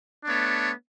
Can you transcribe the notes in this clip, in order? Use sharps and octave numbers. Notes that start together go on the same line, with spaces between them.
A3 B3 D4 C#5